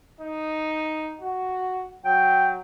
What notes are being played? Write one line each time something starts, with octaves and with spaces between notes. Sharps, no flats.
D#4
F#4
F#3 G5